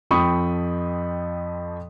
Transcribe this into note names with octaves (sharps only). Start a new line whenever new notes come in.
F2 F3 G5 B5 C#6 D#6